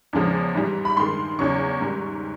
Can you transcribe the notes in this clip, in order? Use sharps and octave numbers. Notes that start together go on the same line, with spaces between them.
E2 C#3 F3 G#3
G#2 E3 G3
B5
G2 D#3 G#3 C6
E2 C#3 F#3 C#6
G#2 D#3 G3